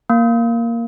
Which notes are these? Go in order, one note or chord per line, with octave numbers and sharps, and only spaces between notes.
A#3